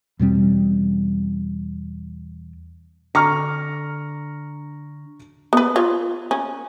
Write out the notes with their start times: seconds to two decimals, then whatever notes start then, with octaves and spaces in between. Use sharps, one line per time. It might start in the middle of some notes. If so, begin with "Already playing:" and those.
0.19 E2 B2 G3 C4
3.15 D3 A#5 C#6 F6
5.53 B3 B4
5.76 F4 C#5
6.31 C#4